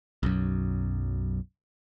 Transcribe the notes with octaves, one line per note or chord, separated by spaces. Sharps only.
B1 F#2